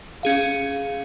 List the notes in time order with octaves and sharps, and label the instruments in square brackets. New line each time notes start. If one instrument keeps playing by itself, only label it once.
[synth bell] C#4 G#4 F5